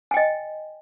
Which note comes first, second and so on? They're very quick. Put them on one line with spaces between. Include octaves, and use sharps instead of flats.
G#5 G5 D#5